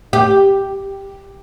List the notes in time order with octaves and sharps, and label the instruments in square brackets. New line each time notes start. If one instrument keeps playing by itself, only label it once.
[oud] G4